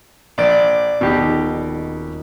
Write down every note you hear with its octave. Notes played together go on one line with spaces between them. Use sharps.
A#1 D5
D#1 B2 D#4 G4